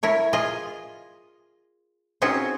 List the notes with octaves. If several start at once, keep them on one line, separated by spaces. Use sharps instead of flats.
E4 A#4 C#5
F4 G#4 D#5
C4 C#4 D#4 F4 F#4 G#4